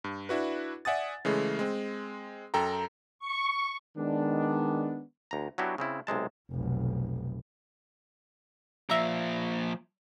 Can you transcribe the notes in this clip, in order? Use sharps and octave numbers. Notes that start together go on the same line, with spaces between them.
G2
D4 E4 F#4 B4
D5 E5 F#5 G#5 D#6 A6
C#3 E3 G#3 A3
G#3 C4
F#2 A4 G5 A#5
C#6
D#3 G#3 B3 D4
D2 A#5
F#3 B3 D4 E4 F#4 G4
C#3 C4 E4
B1 C3 G#3 A5
F1 B1
A#2 F3 E5 A#5